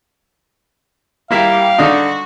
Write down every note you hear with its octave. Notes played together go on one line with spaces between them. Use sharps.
G3 A#3 E4 G4 E5 F5
D3 D4 D#4 F#4